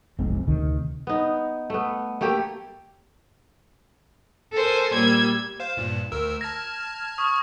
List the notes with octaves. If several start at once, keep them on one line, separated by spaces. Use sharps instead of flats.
F1 B1 G#3 C4
D2 C3 D#3
B3 D#4
A3 B3
A3 A#3 G4
A4 A#4 C5 G#5
A#2 G3 E6 G#6
C5 F5 E7
G2 A#2
D2 A#4 E6
A5 F6 G#6 A#6
C#6 D#6